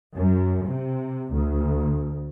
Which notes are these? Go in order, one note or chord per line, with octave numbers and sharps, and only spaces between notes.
F#2
C3
D2